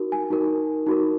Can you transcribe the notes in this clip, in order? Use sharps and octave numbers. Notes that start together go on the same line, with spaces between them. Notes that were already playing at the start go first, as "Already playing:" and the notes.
Already playing: D#4 F#4 A#4
G#5
D#4 F#4 A#4
D#4 F#4 A#4